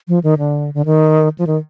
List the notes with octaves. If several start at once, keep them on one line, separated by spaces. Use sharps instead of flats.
F3
D#3
D3
D3
D#3
F3
D#3